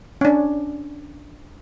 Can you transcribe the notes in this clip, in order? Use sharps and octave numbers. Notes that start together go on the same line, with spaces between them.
C#4 D4